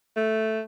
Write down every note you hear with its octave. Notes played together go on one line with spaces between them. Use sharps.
A3